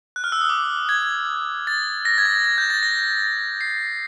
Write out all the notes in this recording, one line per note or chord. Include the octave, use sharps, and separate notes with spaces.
F#6
F6
E6
D#6
D6
G#6
A6
A#6
G#6
A6
G#6
G6
A6
A#6
C7